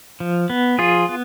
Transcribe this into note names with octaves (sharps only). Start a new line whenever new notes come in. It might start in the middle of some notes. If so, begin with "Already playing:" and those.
F3
B3
F3 F4 G#4
B3